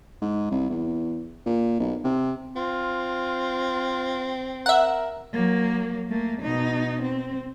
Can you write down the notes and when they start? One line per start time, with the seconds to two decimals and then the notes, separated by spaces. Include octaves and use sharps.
0.22 G#2
0.51 C2
0.70 E2
1.46 A#2
1.80 B1
2.04 C3
2.56 C4 F4
4.66 A#4 E5 F#5
5.33 F#3 A#3
6.09 A3 A#3
6.41 B2 D#4
7.02 C4